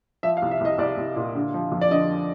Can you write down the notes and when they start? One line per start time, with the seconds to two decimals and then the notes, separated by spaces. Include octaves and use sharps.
0.23 F3 E5
0.37 F5
0.42 C2
0.51 E5
0.61 C2 D#5
0.78 C2 D5
0.98 C2
1.16 A#2
1.35 D3
1.54 F3
1.72 F2
1.81 D5
1.91 D3 D#5